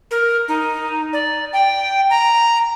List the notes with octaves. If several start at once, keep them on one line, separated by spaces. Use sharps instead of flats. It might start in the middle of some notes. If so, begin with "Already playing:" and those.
A#4
D#4
D5
G5
A#5